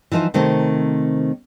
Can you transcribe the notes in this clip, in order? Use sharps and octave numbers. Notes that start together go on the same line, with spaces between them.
E3 F3 D#4 A#4 C5
C3 D#3 A3 C4 A#4 C5